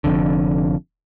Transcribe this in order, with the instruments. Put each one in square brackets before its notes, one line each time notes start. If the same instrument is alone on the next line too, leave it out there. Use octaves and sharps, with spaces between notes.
[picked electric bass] F1 B1 F2 D3